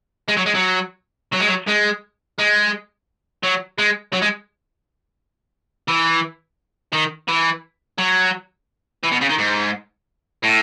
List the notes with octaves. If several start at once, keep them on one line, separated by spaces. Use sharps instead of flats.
G#3
F#3
G#3
F#3
F#3
G#3
F#3
G#3
G#3
F#3
G#3
F#3
G#3
E3
D#3
E3
F#3
E3
B2
C#3
D#3
G#2
A2